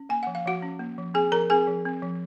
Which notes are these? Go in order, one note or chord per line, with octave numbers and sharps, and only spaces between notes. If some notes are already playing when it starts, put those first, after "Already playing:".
Already playing: C#4
A#3 G#5
F3 F#5
F5
F3 F#4 F#5
C#4
A#3
F3
C4 G#4 G#5
F3 A#4 A#5
C4 G#4 G#5
F3
C4
F3